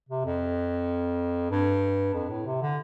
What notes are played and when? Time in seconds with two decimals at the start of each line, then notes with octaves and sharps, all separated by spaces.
0.09 C3
0.25 F2
1.51 G2
2.14 F2
2.30 A2
2.46 C3
2.62 D3